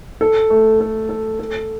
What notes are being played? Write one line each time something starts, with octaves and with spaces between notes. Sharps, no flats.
A4
A3
A4
A4
A4